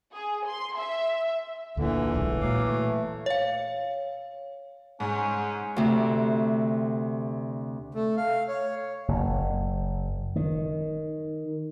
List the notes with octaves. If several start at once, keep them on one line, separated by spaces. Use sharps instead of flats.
G#4
C6
E5
D2 A#2 D3 E3
D1 B1 A2 G#3
A#2 F#3 F5 D6
A3
C#5 F5
G#2 C#4
D2 C3
A3
F5
C#5
F#1
D#3